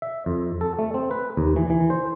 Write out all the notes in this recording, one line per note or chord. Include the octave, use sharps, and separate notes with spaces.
E5
F2
A4
A3
C4
B4
D#2
E3
E3
C5